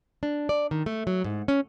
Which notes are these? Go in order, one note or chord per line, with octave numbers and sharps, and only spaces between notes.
D4
D5
D#3
A3
F#3
G#2
C#4